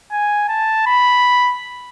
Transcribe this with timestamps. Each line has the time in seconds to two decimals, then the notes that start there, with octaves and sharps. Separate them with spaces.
0.12 G#5
0.49 A5
0.87 B5